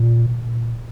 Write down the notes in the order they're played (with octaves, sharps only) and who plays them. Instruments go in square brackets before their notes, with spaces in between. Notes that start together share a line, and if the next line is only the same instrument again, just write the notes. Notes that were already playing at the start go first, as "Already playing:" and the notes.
Already playing: [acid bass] A#2